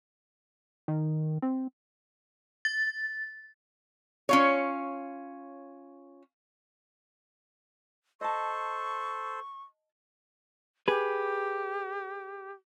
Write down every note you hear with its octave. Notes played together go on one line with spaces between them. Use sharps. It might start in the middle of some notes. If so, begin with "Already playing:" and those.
D#3
C4
A6
C#4 F4 C#5
A4 C5 D#5 A5 C#6
G4 G#4 B4